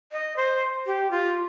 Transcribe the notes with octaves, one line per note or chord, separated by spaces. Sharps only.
D#5
C5
G4
F4